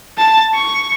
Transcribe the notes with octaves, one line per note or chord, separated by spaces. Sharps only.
A5
C#6